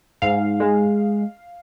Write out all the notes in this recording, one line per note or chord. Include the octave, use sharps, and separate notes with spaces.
G#2 F5
G#3